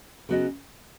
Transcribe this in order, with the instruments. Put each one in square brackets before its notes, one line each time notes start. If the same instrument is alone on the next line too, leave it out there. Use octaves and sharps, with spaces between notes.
[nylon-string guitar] C#3 F#3 B3 F#4 D#5